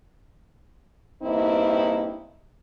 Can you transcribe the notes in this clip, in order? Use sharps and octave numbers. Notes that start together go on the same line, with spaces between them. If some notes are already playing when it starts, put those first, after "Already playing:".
E2 G2 A#3 C4 D#4 E4